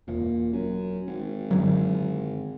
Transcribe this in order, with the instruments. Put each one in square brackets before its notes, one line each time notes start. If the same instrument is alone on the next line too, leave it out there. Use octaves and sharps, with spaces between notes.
[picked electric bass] E1 [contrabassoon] A#2
[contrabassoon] F#2
G#1
[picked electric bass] F#2 D3 F#3